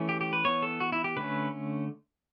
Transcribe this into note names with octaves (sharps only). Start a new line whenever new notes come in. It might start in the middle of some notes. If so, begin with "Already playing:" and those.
Already playing: E3 A3 C#4
G4
G4
B4
E3 B3 C#5
A4
F#4
E4
G4
D3 A3 C#4 B4